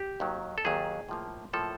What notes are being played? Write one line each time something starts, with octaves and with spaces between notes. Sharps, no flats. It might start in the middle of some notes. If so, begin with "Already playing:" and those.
Already playing: G4
D#2 D#3 F#3
A4
D#2 D#3 F#3 G#4
A2 F3 A#3
A2 F3 A#3 A4